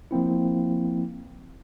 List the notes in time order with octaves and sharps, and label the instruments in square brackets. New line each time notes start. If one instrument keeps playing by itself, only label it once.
[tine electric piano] F3 A#3 C4 E4